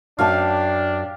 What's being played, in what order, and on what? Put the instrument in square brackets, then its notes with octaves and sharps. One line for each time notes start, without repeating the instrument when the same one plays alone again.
[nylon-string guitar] F#2 F#4 A5 [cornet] D4 [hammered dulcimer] G4 F5